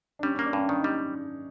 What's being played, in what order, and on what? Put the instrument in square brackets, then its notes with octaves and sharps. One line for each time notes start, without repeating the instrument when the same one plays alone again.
[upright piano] D4
[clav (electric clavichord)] G3 [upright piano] C#4
[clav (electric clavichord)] A#3 [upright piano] C#4
[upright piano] D4
[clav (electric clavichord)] G2 [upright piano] C#4
[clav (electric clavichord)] D#3 [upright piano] D4
[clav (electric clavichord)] G3 [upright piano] D#4